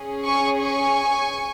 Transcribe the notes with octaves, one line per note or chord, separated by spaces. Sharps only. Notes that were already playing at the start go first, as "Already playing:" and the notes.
Already playing: C#4 G#4
G#5 C#6
G#5 C#6